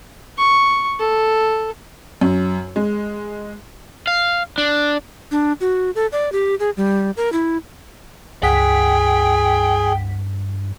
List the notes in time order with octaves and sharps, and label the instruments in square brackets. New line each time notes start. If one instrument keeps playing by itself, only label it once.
[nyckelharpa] C#6
A4
[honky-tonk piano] F#2
G#3
[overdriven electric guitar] F5
D4
[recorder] D4
F#4
A4
D5
G4
G#4
G3
A#4
E4
[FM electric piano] C#2 F#5 B6 [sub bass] G2 [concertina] G#4 [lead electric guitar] G5